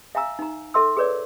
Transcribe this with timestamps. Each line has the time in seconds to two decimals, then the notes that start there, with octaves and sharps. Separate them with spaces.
0.15 E5 F5 G#5 A#5 E6
0.39 D#4 A#5
0.74 A4 E5 C6 E6
0.97 G#4 A#4 B4 C#5 D5